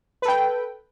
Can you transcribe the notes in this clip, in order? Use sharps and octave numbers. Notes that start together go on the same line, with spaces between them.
A4 B4 G5